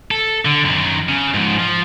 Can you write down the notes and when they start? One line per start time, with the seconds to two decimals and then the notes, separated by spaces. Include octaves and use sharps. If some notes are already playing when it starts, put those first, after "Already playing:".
0.11 A4
0.45 D3
0.65 F#2 D#3
1.09 C#3
1.34 G#2 F3
1.59 F3